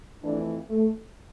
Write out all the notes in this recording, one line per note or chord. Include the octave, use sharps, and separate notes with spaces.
F2 E3 A3 D4
A3